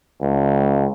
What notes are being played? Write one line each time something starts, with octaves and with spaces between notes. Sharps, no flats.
C#2